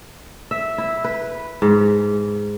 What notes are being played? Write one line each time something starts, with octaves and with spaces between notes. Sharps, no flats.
E5
E4
B4
G#2